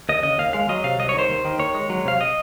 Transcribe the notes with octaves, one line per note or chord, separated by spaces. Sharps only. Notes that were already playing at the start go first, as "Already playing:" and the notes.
D#2 D#5
C#3 D#5
D#2 F5
G#3 F5
F#3 D#5
C3 F5
C2 D#5
C#5
D#3
C5
D#2
D#3
D#2 C#5
G#3
F#3
C3 F5
D#5